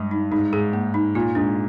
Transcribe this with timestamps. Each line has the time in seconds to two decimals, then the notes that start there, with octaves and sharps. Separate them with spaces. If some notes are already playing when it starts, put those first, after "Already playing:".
Already playing: G2 G#3
0.11 D#4
0.31 G#2 D#4
0.53 G#2 G#4
0.73 A#3
0.94 D#4
1.15 A#2 F4
1.35 G#2 D4